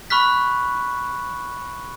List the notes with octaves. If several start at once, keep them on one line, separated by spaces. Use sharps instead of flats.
B5 C#6 F6 F#6 B6